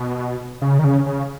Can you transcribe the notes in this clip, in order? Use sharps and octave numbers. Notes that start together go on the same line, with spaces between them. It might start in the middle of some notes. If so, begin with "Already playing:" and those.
Already playing: B2
C#3
D#3
C#3
C#3